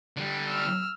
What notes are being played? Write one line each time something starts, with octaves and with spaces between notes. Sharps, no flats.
D3 G3
E6 F6